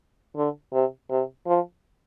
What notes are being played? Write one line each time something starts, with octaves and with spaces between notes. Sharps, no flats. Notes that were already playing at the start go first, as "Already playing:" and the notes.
D3
C3
C3
F3